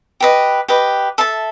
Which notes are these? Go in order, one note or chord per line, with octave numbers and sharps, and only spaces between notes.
G4 B4 D#5
G4 B4 D#5
A4 E5 A5